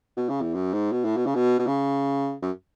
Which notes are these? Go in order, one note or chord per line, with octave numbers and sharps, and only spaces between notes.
B2
C#3
E2
F#2
G#2
B2
A2
B2
C#3
B2
B2
C#3
F#2